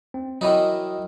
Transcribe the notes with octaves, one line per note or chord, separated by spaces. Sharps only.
C4
D#3 E3 F#3 D#4 D#5